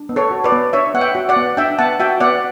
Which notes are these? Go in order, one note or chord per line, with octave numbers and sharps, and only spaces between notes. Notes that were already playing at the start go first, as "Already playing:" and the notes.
Already playing: D4
B3
A4 C#5
F#4
B4 D5
B3
D4 C#5 E5
B3 F#5
E5 G5
F#4
D5 F#5
B3
D4 E5 G5
B3 F#5 A5
F#4 E5 G5
B3 D5 F#5